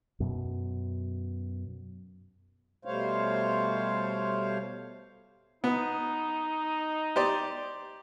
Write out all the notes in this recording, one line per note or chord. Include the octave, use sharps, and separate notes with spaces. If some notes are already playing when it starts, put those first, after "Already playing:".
F#2 B2
B2 G3 A3 C5 C#5 F5
B3 D#4
G4 C5 D5